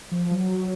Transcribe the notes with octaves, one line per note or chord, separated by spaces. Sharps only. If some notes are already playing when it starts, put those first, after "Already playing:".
F3
F#3